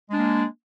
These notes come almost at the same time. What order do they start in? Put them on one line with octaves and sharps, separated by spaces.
G#3 D4 A#3